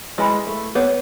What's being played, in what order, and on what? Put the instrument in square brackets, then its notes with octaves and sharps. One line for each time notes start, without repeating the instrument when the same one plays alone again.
[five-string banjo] G#3 [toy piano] E4 B4 E5 G#5 B5
[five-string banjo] A3
[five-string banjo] B3 [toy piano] G#4 C#5 F#5